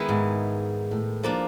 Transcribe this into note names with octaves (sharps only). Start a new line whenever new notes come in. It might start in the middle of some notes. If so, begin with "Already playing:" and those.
Already playing: D#3 G#3 B3 E4
G#2
A2
F3 A#3 D4